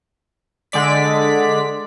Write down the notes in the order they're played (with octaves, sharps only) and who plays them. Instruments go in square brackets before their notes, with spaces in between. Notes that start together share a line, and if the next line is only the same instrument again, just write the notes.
[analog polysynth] D3 G#3 D5 B6